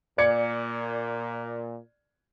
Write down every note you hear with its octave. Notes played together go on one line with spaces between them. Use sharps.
A#2 D5 G#6 C#7